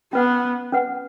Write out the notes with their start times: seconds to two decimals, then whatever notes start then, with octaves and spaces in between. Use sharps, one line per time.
0.13 B3 C#4 B4 F#5
0.72 C#4 B4 F#5